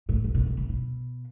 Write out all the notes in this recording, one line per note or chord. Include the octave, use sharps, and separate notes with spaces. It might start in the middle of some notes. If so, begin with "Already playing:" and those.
A2
A#2
B2
B2
C3
B2